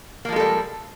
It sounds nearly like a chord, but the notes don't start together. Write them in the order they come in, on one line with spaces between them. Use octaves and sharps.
A#3 F3 G#3 A4 G3